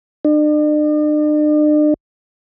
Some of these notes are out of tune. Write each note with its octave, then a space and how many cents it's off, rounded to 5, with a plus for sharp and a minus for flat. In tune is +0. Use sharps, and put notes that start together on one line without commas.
D4 +45